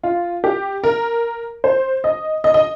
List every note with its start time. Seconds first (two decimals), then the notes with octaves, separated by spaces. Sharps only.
0.04 F4
0.44 G4
0.84 A#4
1.64 C5
2.04 D#5
2.44 D#5
2.54 D#5